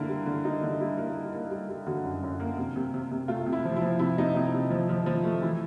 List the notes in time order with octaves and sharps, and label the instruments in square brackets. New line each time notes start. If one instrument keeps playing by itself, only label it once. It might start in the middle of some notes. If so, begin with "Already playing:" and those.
Already playing: [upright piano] D3 A#3 E4
G3
D3
G3 D#4
D3
G3 E4
A#3
G3
A#3
G3
G3
D3 F#4
F#2
F#2
A#3
C3
C3
C3
C3
A3 F4
C3
E4
F3
E4
F3
C3 E4
C3 D#4
C3 D#4
C3
F3
F3
F3
A3
E3 E4